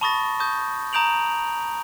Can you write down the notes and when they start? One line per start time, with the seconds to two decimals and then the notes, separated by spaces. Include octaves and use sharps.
0.01 A5 B5 C#6 D#6 A6 A#6
0.40 A5 C#6 D#6 G6
0.93 A#5 D#6 G6 D7 F7 F#7